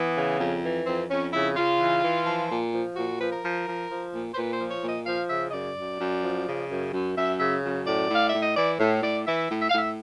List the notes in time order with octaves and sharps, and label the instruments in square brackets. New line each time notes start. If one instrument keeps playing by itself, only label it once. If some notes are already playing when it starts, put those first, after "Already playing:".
Already playing: [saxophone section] E3 B3
C#3
F2
E3
F2 C4
F2 C#4
C#3 E4
C#3 F4
E3
E3
F3
A#2
F3
A#2 F#4
F3 B4
A#4
F3
F3
F3
A#2
C5
A#2 B4
C5
F3
C#5
A#2
D#5
F3 F5
C#3 E5
D#5
F#2 D5
F#2
F#2
F3
C#3
F#2
F#2
F#2 E5
C#3 E5
F#2
A2 D5
A2 F5
A2 E5
D#5
E3 D5
A2
A2 D5
E3 E5
A2
E5
F5
A2 E5